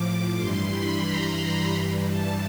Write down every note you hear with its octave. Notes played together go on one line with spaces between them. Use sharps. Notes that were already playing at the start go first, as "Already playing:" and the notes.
Already playing: A2 F3 D6
G2 E3 G3 C6
B5
A#5
G2 E3 G3
A5